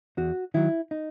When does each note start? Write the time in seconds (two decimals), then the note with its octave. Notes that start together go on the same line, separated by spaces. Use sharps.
0.17 E2 F#4
0.54 D#3 F#3 E4
0.91 D#4